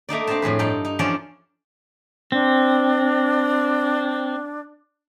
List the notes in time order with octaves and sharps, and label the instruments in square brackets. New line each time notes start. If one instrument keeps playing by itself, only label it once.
[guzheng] A3 A#3 D#4 D5
C4 D4 C5 D#5 A5
F2 A2 G#4 B4
G2 D#4 A4 G5 C6
D#4
E2 F3 C#4 D4 C#5 D5
[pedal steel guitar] C4 [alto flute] D4